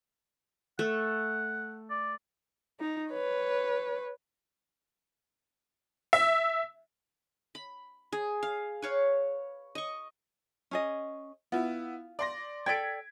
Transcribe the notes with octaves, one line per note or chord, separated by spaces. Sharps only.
A3 F#5
D5
D#4
B4 C#5
E5
B5
G#4
F5
B4 C#5 F5
D#5 C#6
C#4 G#4 D#5
B3 E4 F4
D5 C6 A#6
A4 D5 G5 G#6 B6 D7